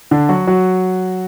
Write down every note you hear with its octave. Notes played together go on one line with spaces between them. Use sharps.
D3 D4
F#3 F#4
F#3 F#4